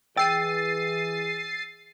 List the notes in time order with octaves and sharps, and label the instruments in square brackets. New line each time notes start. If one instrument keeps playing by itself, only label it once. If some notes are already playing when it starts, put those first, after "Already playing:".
[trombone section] E3 G#4 [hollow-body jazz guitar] G5 [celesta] E6 [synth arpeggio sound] A6 C7 D#7